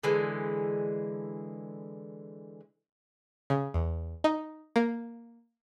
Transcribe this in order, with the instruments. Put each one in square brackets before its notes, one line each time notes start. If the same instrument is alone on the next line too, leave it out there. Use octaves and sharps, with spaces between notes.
[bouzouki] D3 E3 G#3
[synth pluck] C#3
E2
D#4
A#3